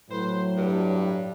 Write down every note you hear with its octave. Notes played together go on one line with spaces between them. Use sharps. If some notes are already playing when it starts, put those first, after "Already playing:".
A2 F#3 B4 C5
G2